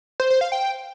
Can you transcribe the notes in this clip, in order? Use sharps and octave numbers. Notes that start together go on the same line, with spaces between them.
C5
C5
F5
G5